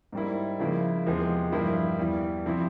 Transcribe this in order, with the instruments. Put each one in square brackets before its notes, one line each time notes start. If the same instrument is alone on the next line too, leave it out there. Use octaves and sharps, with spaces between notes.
[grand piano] G#2 G3 A#3 E4
C#3 F3 A#3 E4
E2 C3 F3 G#3
G2 F3 A#3 E4
E2 E3 G3
C3 F3 C4 E4